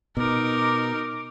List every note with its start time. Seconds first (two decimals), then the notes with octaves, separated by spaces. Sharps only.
0.17 B2 D#4 A#4 D6